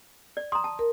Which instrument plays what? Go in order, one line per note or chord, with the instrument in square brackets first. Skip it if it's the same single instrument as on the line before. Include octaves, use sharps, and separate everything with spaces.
[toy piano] D5
[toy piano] A#5 C6 [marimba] D#6
[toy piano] A5
[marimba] A#4